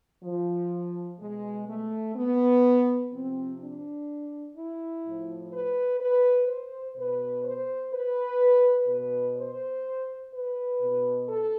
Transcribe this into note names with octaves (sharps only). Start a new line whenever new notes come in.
F3
B2 G#3
A3
B3
C3 F3 C4
D4
E4
A2 F3
B4
B4
C5
B2 B4
C5
B4
B2 B4
C5
B4
B2
A4